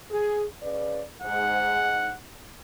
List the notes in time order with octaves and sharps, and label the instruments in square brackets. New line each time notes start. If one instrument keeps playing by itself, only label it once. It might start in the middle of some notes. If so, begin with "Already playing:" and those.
[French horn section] G#4
C#3 B4 D5
[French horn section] G#2 [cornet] F#5